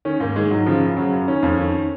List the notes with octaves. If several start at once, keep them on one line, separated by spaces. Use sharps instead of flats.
D#3 C#4
G#2 A#3
D#3 G#3
G#2 F#3
C#3 F3
F#2
C#3 F#3
F#2
D#3 C#4
F2
D#3